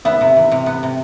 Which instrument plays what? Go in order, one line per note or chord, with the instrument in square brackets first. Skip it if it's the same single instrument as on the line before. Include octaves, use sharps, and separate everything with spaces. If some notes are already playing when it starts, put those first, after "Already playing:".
[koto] B3 [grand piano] E5
[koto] C3
E3
C3
B3
C3